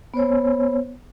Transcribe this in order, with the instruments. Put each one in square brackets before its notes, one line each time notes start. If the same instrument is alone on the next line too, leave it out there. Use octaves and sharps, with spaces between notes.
[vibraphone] B3 C5 C#5